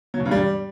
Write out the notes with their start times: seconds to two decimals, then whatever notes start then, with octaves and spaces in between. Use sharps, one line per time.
0.14 F#3
0.20 B2
0.26 G2
0.31 G3